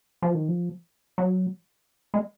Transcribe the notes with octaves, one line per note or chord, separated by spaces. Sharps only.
F3
D#3
F3
F#3
G#3